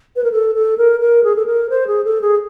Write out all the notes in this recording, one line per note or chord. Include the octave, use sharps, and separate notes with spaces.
B4
A#4
A4
A4
A#4
A#4
G#4
A4
A#4
C5
G#4
A4
G#4